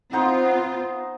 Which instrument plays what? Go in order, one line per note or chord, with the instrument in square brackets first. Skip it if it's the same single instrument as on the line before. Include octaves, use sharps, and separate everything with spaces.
[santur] B3 D#4 C5 [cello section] C4 F4